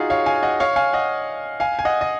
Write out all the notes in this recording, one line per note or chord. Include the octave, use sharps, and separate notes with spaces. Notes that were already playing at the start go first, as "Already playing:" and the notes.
Already playing: D#4 F4 F#4 G#4
C#5 F5
F5 G#5
D#5 F#5
C#5 F5
F5 G#5
D#5 F#5
F5 G#5
G#5
D#5 F#5
D#5